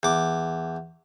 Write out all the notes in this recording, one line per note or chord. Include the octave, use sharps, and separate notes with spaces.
E2 D6